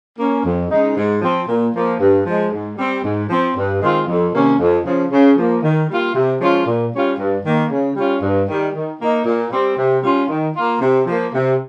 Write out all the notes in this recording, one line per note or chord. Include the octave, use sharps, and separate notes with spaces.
A#3 C#4
F2
C#3 G#3 D#4
G#2
F3 C4
A#2
F3 A#3
G2
F3 G#3
G#2
G3 C4
G#2
F3 C4
G2
D#3 G#3 C4 F4
F2
C3 D#3 A#3 C#4
F2
C#3 F3
C#3
F3 A#3
D#3
G3 A#3 F4
C3
F3 G#3 C#4 F4
A#2
G3 C#4 F4
G2
D#3 A#3
C#3
G3 C#4 F4
G2
D#3 G3
D#3
A#3 D#4
A#2
G3 C4
C3
G3 C#4 F4
D#3
A#3 F4
C3
F3 A#3
C3